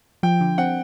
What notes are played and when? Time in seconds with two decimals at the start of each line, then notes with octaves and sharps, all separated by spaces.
0.23 F3 G5
0.41 D3
0.58 C4 F#5